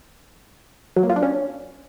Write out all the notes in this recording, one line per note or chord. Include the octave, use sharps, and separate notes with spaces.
F#3
A#3
F4
D4
C#4